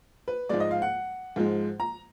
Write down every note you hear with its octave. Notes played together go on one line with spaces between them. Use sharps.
B4
G#2 F3 G#3 D5
D#5
F5
F#5
G#2 F3 G#3
A#5